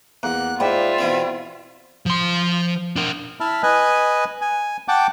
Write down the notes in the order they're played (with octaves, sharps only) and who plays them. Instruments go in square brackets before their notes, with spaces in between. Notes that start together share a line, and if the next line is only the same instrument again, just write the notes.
[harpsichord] E2 [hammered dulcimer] A#3 F#5 [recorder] F#6
[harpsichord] G#2 [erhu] F4 [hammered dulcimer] D5 G5 B5 [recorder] E5
[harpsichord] B2 E3 C4
[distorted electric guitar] F3 C6
D4 A#4
[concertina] E4 E5 A5 B5 F6
B4 D#5 G#5 F#6
G#5
F#5 G5 A5 D6